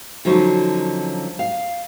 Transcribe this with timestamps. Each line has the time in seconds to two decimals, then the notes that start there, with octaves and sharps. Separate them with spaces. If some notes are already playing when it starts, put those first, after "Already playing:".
0.25 D3 F3 F#3 C#4 D#4
1.39 F5